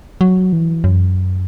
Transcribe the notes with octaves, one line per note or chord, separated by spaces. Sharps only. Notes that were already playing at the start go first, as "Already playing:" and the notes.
F#3
E3
F#2